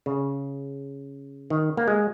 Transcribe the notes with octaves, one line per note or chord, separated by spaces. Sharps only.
C#3
D#3
A#3
G#3